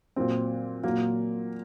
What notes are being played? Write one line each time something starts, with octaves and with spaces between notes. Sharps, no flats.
A#2 F#3 C4
A#2 F#3 A#3